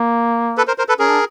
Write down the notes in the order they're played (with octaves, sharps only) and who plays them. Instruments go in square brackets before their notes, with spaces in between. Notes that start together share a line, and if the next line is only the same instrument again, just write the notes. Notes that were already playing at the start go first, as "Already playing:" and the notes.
Already playing: [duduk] A#3
[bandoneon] A4 B4
A#4 C5
A#4 C5
A4 B4
[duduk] C#4 [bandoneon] G#4 A#4
[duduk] D4